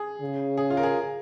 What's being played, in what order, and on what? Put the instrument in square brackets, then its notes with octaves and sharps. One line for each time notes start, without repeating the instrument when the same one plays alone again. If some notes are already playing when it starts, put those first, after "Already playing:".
Already playing: [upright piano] G#4
[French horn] C#3
[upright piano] G#4
F4
A#4
G#4